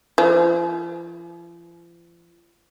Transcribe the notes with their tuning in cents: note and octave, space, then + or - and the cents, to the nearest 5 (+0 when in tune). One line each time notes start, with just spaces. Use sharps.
F3 -40